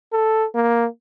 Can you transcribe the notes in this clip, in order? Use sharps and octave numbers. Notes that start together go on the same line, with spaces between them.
A4
A#3